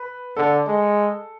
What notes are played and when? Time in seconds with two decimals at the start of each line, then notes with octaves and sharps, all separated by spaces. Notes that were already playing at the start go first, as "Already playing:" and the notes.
Already playing: B4
0.37 D3 A4
0.67 G#3